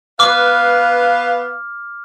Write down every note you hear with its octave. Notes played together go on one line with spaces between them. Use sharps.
B3 B4 F5 D6 F6